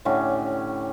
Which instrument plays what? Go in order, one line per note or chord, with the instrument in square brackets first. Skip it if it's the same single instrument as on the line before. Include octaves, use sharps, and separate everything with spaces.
[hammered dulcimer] A2 D3 C#4 G4